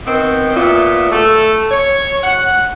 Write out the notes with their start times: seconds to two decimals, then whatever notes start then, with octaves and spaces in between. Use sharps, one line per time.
0.06 D#3 B3 C4
0.55 A#2 B3 F4 E5
1.11 A3 A4
1.71 C#5
2.23 F#5